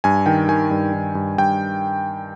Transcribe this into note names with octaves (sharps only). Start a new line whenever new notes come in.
G2 G#5
D#3 G5
D#3 G#5
G2
D#3
G2
G2 G5